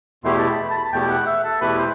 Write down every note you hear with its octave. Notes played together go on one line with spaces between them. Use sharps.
E2 B2 A3 E4 G4 C6
A5
B5
A5
B5
A5
E2 B2 A3 E4 G4 G5
F#5
E5
A4
E2 B2 A3 E4 G4 B4
C5